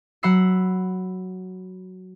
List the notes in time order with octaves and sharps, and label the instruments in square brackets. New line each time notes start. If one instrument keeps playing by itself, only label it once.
[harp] F#3 F#5 B5 E6 C7